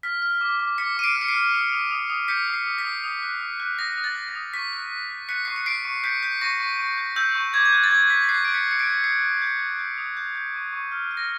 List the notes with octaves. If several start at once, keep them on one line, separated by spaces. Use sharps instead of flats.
F6 B6
F6
D6
D6
D6 B6 C#7
D6 D#7
C7 D7
F6
C#7
C7 D7
F6
D#6
D#6
D#6
D#6
G6 B6 C#7
D#6
C7
D#6
B6
D#6
D#6
F#6
D#6
F#6
D#6 A#6
D#6
A6
F#6
A#6
D#6
C#6 B6
F#6
F#6
F#6
F#6 B6 C#7
C#6 C7
C#7
F#6 C7 D7
C#6
G6 B6 C#7
G6 B6
C#6 A#6
C#6
C#6
G6
E6 G6
C#6
D6 G#6
G#6
F#6 G6
A6
D6 G#6
F#6 B6
B6
F#6 C7
F#6 D7
B6 C#7
F#6 C#7
C7 D7
F#6
D#6 C7
D#6
G6
G6
G6
D#6
G6
G6
C#6
C#6
F6
F6
A#6